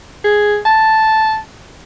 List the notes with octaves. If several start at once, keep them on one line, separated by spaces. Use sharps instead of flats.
G#4
A5